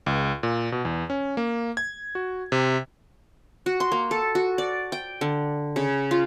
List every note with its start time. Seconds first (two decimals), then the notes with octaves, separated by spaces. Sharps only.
0.06 C#2
0.43 A#2
0.72 B2
0.85 E2
1.10 C#4
1.37 A#3
1.77 G#6
2.15 F#4
2.52 C3
3.66 F#4
3.80 C6
3.92 A#3
4.11 A4
4.35 F#4
4.58 D5
4.92 G5
5.21 D3
5.76 C#3
6.11 F4